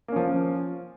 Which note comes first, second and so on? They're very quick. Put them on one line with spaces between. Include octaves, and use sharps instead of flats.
A#3 C#4 F3